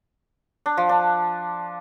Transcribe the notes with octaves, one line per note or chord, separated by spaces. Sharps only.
D4
F3
D4